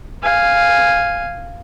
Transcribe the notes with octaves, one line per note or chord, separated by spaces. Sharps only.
F5 G#5